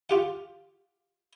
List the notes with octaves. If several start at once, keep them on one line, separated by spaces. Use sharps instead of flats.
F4 G4 F#5